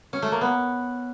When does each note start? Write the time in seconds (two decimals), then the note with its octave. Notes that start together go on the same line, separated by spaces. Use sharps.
0.13 C#4
0.22 A3
0.32 A#3
0.41 B3